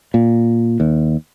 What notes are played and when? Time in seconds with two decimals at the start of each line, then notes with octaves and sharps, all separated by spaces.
0.14 A#2
0.80 D#2